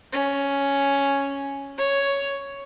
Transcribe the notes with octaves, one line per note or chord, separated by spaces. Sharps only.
C#4
C#5